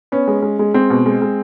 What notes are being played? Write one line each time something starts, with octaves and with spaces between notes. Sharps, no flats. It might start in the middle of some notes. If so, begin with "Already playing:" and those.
B3 C#4
G#3
G#3
G#3
G#3 C4
B2
G#3
G#3